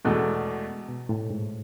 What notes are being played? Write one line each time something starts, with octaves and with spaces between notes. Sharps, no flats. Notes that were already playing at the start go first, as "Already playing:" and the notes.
E2 B2 G#3 A3
B2
A2
G#2